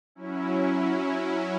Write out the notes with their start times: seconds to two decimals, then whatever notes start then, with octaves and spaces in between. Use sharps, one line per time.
0.15 F#3 C#4 E4